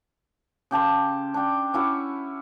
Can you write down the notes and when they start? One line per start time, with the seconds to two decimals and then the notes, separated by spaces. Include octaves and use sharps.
0.71 C#3 G4 A5 C6
1.34 D4 G5
1.74 C#4 E4 F#4 C#5